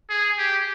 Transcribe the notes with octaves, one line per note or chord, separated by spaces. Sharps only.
G#4
G4